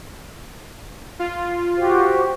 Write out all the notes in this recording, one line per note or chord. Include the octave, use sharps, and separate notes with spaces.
F4
F#4 G4 C5